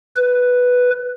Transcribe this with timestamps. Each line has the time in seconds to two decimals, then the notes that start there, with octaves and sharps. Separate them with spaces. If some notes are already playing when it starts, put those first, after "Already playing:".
0.16 B4